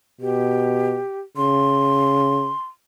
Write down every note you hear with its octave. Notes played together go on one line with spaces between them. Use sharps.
B2 G4
C#3 C6